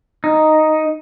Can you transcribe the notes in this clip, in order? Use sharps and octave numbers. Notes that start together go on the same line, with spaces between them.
D#4